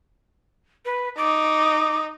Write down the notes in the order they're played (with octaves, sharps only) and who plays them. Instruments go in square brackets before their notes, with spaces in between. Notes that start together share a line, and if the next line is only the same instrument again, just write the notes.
[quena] B4
[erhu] D#4 [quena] D6